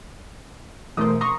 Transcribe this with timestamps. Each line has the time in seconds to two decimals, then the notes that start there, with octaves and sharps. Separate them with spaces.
0.97 E1 E3 A3 A#4 C5 D#6
1.21 A#5 C6 C#6 D#6